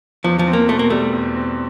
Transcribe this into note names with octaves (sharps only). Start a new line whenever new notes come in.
E2 F3
F3
C4
A#3
B2 A3
A#3
G3 A3
E2
C4